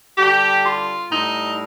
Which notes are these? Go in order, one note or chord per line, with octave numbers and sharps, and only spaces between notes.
D3 G3 G4
F4
A2 G3 D#4